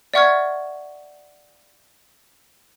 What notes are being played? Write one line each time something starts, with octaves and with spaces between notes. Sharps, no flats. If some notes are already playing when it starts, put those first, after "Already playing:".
D5 E5 F#5 C#6 F6 G#6